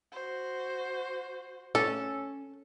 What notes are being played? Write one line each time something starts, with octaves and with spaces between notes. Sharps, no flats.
F#4 C5
C#4 A4